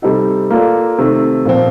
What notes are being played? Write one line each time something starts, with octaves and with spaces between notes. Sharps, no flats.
C3 G3 C4 D#4 A4
A#3 F4 A4 D5
C3 D#3 A3
A#2 F3 C4